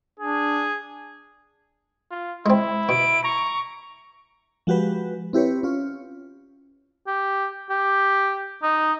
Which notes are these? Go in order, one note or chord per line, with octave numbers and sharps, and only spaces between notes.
D4 G#4
F4
G#3 C4 E4
B2 D7
A#5 C#6
F3 G#3 F#4 G4 B4
C4 E4 G4 B4 C#5
C#4 F4 C#5
G4
G4
D#4